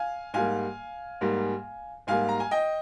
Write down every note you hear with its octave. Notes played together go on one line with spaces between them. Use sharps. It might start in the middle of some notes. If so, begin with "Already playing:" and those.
Already playing: F5 G#5
G#2 G3 A#3 F5 G#5
G#2 G3 A#3
G#2 G3 A#3 F5 G#5
A#5
G#5
D#5 G5